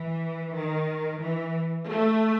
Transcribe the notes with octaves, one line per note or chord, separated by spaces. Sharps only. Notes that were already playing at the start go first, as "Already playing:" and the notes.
Already playing: E3
D#3
E3
A3